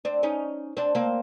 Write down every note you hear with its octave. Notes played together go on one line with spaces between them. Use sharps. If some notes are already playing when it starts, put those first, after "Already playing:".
C4 D4
C#4 D#4
C4 D4
A#3 C4